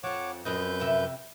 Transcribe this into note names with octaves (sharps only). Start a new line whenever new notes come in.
F2 F3 C#5 F#5 D6
F#2 F3 C4 B4 D#5 G6
F2 C3 E5